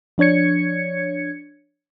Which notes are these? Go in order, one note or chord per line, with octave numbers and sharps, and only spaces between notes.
F3 D4 C#5 G#6 C#7